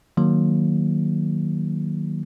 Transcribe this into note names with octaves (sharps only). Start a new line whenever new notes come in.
D#3 F#3 A#3